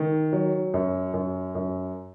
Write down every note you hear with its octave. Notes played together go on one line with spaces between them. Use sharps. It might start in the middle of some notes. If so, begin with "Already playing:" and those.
Already playing: D#3
F#3
F#2
F#2
F#2